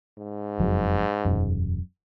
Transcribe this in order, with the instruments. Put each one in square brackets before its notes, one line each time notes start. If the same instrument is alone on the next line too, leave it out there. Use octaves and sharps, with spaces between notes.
[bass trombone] G#2
[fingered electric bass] F#1 F2 F#3
E1 F#2